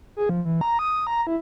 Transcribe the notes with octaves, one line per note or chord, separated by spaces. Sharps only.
G#4
F3
E3
A#5
D#6
A#5
E4